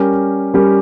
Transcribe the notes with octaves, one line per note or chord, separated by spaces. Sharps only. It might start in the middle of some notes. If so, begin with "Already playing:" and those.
Already playing: G3 C#4 G4 A#4
G3 C#4 G4 A#4